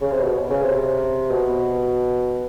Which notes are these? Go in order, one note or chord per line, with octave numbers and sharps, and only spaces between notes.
C#3
C3
B2
C#3
C3
B2